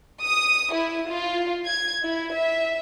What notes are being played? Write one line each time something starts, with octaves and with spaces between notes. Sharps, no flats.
D#6
E4
F4
G#6
E4
E5